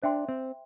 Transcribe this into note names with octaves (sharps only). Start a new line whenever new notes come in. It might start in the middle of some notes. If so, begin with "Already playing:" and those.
D4 C5 E5 G5 C6
C4